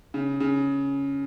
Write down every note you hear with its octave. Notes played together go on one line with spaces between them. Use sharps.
C#3
C#3